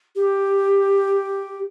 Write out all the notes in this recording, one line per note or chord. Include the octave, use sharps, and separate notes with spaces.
G4